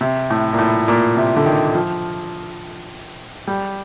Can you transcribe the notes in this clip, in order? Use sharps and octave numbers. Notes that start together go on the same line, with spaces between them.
C3
A2
A#2
A2
A#2
C3
D3
D#3
F3
G3